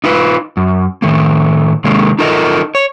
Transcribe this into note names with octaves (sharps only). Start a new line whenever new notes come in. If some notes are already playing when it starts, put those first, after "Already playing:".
D#4 F4 B4
F#2
A2 D#3 A3 A#3
C3 D#3 G#3 A#3
D#4 F4 A4 A#4 D#5
C#5